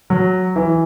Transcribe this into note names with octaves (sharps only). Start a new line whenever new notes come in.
F#3
E3